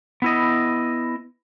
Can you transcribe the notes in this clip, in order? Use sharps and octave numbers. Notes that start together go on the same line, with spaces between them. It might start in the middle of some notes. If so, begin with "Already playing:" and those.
B3 E4 D#5